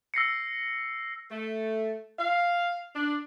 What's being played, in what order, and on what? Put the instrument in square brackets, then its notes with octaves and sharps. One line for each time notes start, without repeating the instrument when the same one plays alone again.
[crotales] E6 A#6 C7 C#7
[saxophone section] A3
F5
D4